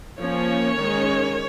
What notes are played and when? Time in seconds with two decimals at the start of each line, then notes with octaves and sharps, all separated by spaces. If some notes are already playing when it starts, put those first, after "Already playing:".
0.19 F3 A#3 C#4 C#5
0.77 D#3 G#3 C#4